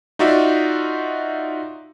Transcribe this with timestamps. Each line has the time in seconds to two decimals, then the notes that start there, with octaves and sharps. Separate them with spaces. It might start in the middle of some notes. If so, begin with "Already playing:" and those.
0.19 D#4 F4 F#4 D5 E5